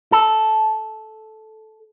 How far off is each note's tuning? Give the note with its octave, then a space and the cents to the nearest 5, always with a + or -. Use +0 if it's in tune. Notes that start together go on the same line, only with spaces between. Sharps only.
A4 -10